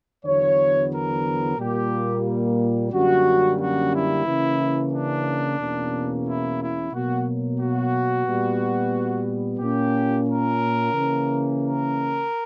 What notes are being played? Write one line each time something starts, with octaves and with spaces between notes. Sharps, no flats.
E2 D3 F#3 B3 C#5
A#4
A#2 G3 A#3 G4
F#2 D3 G3 A#3 C#4 F#4
F#4
E4
C#3 E3 A#3 C#4
D4
E2 B2 A#3 C#4
E4
E4
B2 F#3 A#3 F#4
F#4
A#2 G3 B3
A#2 A#3 C#4 G4
A#4
C#3 E3 A#3 C#4
A#4